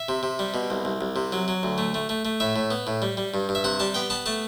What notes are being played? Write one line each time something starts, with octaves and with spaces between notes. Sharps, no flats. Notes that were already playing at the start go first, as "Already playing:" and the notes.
Already playing: E5
C3
C3
G3
B2
C2
C2
C2
C3
F#3
F#3
D2
A3
A3
A3
A3
A2 E5
A2
B3
A2
G3
G3
G2
G2
E5
C3 F#5
G3 A5
B3 G5
B3 A5
A3 A5